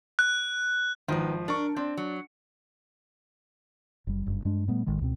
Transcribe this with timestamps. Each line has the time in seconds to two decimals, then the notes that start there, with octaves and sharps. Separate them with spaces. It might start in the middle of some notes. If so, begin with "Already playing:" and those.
0.19 F#6
1.08 G#1 D#3 F3 B4
1.48 D4 A#4 C#6
1.76 C4 D4
1.97 F#3
4.07 F#1 G3
4.26 F#1 G2
4.45 G2 G#3 D4
4.68 A#2 G3 A3 B3
4.86 A1 D#3 G#3
5.01 C#2 B2 C4